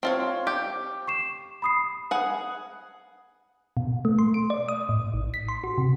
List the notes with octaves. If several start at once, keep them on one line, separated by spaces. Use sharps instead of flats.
C4 F4 C#5
G4
C#6 C7 E7
B5 D#6 C7
G#4 F#5
B2
A3
C6
D7
D5
D#6
A2
A1
B6
C6
F#4
C3